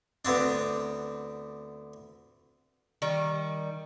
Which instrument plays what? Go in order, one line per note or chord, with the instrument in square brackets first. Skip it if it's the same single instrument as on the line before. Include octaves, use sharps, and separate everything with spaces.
[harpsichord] D2 B3 C4 D4
[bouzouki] D#3 G3